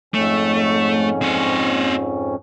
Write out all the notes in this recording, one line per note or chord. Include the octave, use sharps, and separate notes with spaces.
F2 G#2 A3 C#4
C4 C#5